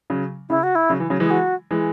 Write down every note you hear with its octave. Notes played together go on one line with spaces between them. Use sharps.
C#3 F#3
C#3 E4
F#4
E4
C#3 F#3
E3
C#3 F#3
E3 G#3 G#4
F#4
E3 G#3